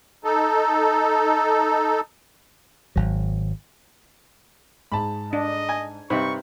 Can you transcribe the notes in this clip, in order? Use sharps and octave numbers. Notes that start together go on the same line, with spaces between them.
D#4 A4
G#1 F#3
G#2 A5 B5
D4 D#5
G#5
G2 C3 D#4 C5 B5 C#6